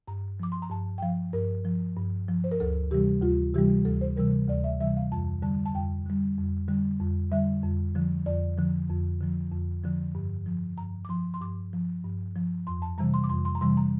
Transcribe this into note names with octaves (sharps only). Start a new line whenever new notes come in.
G2 A#5
F3 D6
C6
A#5
G2 A5
G5
F3 F5
G2 A#4
F3
G2
F3
C5
A#4
D2 A4
C3 E3 G3 G4
D2 F4
C3 E3 G3 G4
D2 A4
C5
C3 E3 G3 A#4
D2 D5
E5
C3 E3 G3 E5
F5
F2 A5
D3 G3 A5
A5
F2 G5
D3 G3
F2
D3 G3
F2
D3 G3 E5
F2
D3 F3
F2 D5
D3 F3
F2
D3 F3
F2
D3 F3
G2
F3
G2 A#5
D6
F3 C6
C6
G2 D6
F3
G2
F3
F2 C6
A5
C3 E3 G3 A#5
C6
D6
F2 C6
C6
A#5
C3 E3 G3 C6
A#5